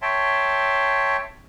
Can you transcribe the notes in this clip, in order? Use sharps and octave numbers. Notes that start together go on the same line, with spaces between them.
C#5 E5 G5 A5 C6